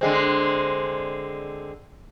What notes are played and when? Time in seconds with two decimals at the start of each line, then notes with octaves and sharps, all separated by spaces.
0.01 D3 G#3 C4